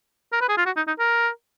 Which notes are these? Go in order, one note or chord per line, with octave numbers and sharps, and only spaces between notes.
A#4
B4
G#4
F4
F#4
D#4
D#4
A#4